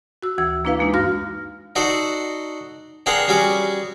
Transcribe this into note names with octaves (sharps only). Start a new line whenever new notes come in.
F#4 E6
D2 E3 E6
A#3 D4 E4 B4 F5
G#3 A#3 D4 D#4
G2 F#4 F5 F6 A#6
D#4 F#4 A4 C5 D5
C4 D4 G#4 A#4 C5 F#5
G3 C#4 F#4 G#4 D6